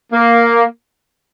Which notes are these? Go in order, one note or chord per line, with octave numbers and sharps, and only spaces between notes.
A#3